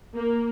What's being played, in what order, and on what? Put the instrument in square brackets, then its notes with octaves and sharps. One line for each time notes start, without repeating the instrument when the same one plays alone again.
[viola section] A#3